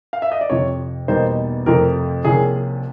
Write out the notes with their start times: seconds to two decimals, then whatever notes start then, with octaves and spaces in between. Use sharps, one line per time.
0.13 F5
0.22 E5
0.32 D#5
0.41 D5
0.50 F2 C3 F3 C#5
1.08 E2 B2 G3 A#3 D#4 C5
1.66 F2 C3 F3 A3 A#4
2.24 C2 C3 F3 A#3 C#4 G#4